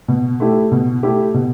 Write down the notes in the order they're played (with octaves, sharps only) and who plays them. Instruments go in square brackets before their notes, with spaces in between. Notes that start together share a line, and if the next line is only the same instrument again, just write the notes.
[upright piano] B2
A3 E4 G4
B2
A3 E4 G4
B2